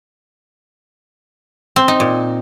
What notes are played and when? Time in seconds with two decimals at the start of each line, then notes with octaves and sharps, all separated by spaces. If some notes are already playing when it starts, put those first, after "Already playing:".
1.76 C4
1.88 D#4
2.00 A#2